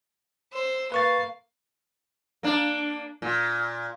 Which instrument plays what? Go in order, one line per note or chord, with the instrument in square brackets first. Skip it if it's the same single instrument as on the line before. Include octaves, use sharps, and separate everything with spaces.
[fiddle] C5 E6
[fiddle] A#3 F5 [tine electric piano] B4 C#6 A6
[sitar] A#3 D4
A#2